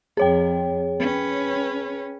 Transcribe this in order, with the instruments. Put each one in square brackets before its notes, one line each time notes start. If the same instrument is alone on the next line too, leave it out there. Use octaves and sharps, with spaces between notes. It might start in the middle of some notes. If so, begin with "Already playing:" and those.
[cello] F2 [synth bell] G#4 C#5 G5
[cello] C#4 B4